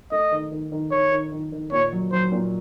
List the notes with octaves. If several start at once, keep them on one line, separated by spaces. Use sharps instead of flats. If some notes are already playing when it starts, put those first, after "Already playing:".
A3 D#5
D#3
D#3
D#3
D#3 C#5
D#3
D#3
D#3
A#2 C#5
F#3
F#3 C5
A#2